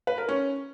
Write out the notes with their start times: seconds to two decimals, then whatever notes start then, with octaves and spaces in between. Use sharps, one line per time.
0.07 B4
0.18 A#4
0.29 C#4